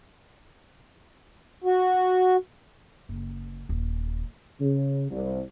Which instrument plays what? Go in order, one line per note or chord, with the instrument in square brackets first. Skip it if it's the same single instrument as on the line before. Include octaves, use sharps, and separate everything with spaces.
[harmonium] F#4
[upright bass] F#1
D#1
[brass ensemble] C#3
C2